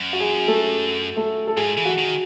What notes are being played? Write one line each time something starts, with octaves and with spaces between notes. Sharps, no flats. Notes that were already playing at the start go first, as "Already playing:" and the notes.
Already playing: F#2
F#4
G#4
A3 A4
A3 A4
A4
G#2 G#4
E3
F#4
D#3